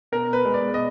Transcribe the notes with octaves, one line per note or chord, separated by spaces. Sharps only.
B2 A#4
B4
G#3 B3
D5
B2 D#5